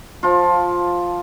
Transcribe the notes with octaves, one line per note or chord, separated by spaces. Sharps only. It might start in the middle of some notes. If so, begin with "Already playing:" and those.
F3 F4